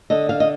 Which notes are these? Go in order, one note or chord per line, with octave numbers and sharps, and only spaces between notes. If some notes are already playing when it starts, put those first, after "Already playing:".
D3 D#5
F5
D#5